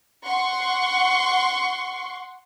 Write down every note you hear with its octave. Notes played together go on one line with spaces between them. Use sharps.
F#5 C6 C#6